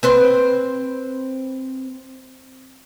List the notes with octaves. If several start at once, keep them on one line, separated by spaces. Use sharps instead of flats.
C4 B4 C5